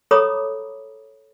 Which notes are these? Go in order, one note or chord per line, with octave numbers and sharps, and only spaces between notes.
A4 C#5 A#5 B5 D6 D#6